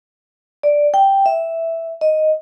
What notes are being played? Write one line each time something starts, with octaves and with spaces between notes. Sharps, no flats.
D5
G5
E5
D#5